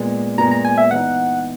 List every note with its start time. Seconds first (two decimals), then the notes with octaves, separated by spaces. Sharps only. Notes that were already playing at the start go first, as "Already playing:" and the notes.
Already playing: A#2 G#3 B3
0.38 A#2 G#3 B3 A#5
0.51 A#5
0.65 G#5
0.78 E5
0.91 E3 B3 D#4 F#5